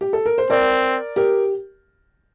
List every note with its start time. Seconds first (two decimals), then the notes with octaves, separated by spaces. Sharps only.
0.01 G4
0.13 A4
0.26 A#4
0.38 C5
0.50 C4 A#4 D5
1.16 G4 A#4